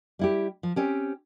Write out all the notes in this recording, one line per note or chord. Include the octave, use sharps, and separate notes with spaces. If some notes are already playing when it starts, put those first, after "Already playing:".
G3 E4 G4
F3
C4 C#4 G4